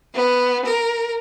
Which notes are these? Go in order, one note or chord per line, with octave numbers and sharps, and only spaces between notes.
B3
A#4